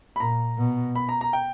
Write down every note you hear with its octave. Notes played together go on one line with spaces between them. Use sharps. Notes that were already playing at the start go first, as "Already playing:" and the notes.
B5
A#2 A#5
B2
B5
A#5
A#5
G5